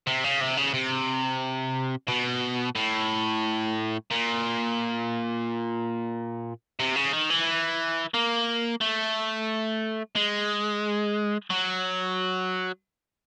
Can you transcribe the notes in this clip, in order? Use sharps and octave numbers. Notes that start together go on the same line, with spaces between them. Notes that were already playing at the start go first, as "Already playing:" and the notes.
C3
C#3
C3
C#3
C3
B2
A2
A#2
C3
C#3
D#3
E3
A#3
A3
G#3
F#3